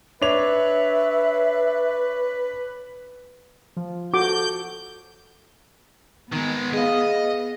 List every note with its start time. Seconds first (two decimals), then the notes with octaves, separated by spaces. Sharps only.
0.22 D4 B4 C#5 E5 F7
3.77 F3
4.14 F#4 A4 D6 G6
6.32 D#3 G#3 B3
6.74 G#4 D#5 F5